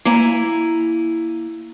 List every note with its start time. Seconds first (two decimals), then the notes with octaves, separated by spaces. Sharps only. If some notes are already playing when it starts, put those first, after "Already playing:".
0.05 A#3 E4 G#5 A#5